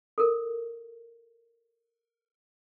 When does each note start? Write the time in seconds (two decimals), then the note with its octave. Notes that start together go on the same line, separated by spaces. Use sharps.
0.18 A4 A#4